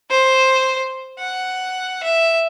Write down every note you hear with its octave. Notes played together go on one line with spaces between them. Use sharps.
C5
F#5
E5